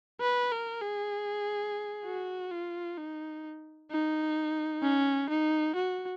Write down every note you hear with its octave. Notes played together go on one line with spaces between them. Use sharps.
B4
A#4
G#4
F#4
F4
D#4
D#4
C#4
D#4
F#4